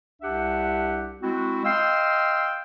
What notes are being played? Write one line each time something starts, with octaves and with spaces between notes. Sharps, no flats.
C2 D4 G4 E5 F#5
G#3 C4 E4 F#4
D#5 F5 G5 C6 E6